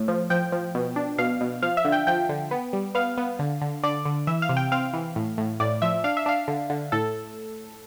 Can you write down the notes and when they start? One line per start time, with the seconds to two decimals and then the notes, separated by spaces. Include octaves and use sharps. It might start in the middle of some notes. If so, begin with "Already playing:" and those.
Already playing: A2
0.08 F3
0.30 F3 G5
0.52 F3
0.75 B2
0.96 D4
1.18 B2 F5
1.41 B2
1.63 F3 F5
1.77 E5
1.85 D3
1.92 G5
2.07 F3 G5
2.29 D3
2.51 B3
2.73 G3
2.95 B3 F5
3.17 B3
3.39 D3
3.61 D3
3.83 D3 D5
4.05 D3
4.27 E3 E5
4.42 F5
4.49 C3
4.57 G5
4.72 C4 F5
4.94 E3
5.16 A2
5.38 A2
5.60 A2 D5
5.82 F3 E5
6.04 D4 F5
6.17 E5
6.26 D4 F5
6.48 D3
6.70 D3
6.92 A2 A4